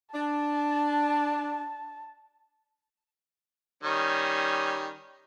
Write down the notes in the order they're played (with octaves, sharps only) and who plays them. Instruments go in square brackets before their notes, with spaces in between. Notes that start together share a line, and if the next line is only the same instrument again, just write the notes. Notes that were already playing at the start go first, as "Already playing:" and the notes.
[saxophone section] D4 [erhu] A5
[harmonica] D#3 G3 C#4